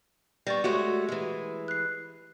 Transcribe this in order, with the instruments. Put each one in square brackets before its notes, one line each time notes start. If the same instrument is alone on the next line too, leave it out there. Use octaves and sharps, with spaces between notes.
[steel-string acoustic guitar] G3 B3 [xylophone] C#6 A6 A#6
[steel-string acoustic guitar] G#3 A3 F#4 [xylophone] G4 C#5 C#6
[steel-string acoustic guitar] E3 G#3
[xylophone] F#6 C7